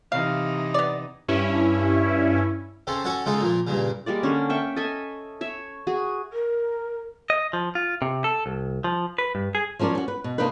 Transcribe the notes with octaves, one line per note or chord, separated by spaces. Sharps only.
C3 E3 D#4 F5
B3 D5
G2 C#4 E4
C#3 C4 C#4 A4
C#4 F#4 A4 C#5 F#5 A5
C#3 G#3 D#4 F4 A4
A#2 F3 A#3
G2 A#2 C#3
G3 G#3 A#3 D5
D3 C#4
E5 G5 C#6
A4 D#5 E5 G#5
C#5 E5
F#4 G#4
A#4
D#5
F3
F4
C3
A4
C2
F3
B4
G2
G#4
F3 F#3 C#4 A#4 D5
C#4 F#4
B4
B2
C3 A#3 D4 D#4 B4